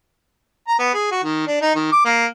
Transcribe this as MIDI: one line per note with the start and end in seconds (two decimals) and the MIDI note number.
0.68 0.77 82
0.79 0.93 59
0.94 1.08 68
1.11 1.23 66
1.24 1.42 51
1.47 1.58 62
1.61 1.73 63
1.75 1.89 51
1.92 2.01 86
2.05 2.25 58